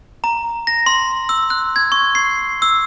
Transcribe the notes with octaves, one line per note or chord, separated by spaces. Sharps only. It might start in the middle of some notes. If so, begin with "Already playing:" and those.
A#5
A#6
C6
E6
F#6
G#6
C#6
C7
E6